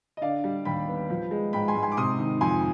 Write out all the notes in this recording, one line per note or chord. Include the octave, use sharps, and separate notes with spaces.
D#5
D3 D5 F5
G3
D#2 G5 B5
B3
F3
G#3
G#2 G5 B5
G#5 C6
G#2
G#5 C6
D6
C3 C6 D#6
D#3
F2 G#5 C6